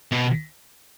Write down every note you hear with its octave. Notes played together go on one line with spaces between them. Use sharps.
B2